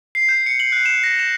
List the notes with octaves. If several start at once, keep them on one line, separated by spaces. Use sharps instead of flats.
C7
G6
C#7
F#7
F#6
E7
A#6
E7